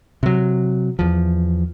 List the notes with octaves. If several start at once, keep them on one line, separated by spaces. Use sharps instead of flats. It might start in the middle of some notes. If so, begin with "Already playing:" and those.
C3 F#3
E2 F3